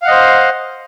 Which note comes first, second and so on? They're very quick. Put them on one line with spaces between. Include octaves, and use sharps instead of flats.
F5 F#5 D#5 C5